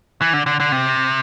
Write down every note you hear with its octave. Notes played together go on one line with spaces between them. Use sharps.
E3
D3
D3
D3
C3